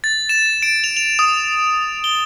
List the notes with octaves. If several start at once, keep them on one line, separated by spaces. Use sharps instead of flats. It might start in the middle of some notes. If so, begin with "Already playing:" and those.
A6
E7
D7
F7
F7
D#6
G7